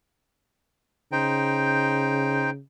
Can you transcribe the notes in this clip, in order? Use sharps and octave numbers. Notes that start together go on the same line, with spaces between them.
C#3 D#4 C5 G5